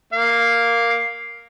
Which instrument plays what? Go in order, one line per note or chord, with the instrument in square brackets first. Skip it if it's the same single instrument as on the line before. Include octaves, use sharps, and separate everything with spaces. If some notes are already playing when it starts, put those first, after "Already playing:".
[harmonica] A#3 F5